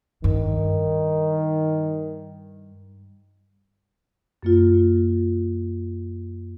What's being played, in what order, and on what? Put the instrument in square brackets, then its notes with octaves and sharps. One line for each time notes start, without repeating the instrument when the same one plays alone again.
[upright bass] G2 [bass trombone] D#3
[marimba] F#2 A#3 F4